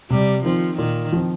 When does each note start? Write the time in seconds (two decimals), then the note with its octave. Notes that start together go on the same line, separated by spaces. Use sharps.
0.10 C3 G3
0.44 D#3 F3 C4
0.78 A#2 D#3
1.12 F3 C4